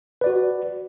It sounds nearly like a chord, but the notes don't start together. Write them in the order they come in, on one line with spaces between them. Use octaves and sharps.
B4 D5 F#4